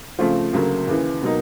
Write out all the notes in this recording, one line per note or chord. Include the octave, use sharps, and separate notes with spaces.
C#3 F3 A3 C4 F4
D2 C#3 F#3 A#3
D#2 C#3 E3
B2 F#3 A#3 D#4